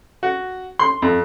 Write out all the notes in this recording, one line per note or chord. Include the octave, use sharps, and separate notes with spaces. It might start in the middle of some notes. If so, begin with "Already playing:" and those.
F#4
C6
F2